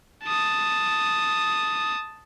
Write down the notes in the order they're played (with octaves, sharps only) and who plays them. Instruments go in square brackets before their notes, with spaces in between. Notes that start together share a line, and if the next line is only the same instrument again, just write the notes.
[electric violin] A5 D#6